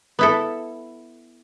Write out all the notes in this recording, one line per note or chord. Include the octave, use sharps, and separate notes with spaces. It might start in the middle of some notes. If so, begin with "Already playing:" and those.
B3 E4 A4